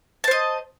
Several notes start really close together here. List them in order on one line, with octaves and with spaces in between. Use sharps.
A5 C5 D#5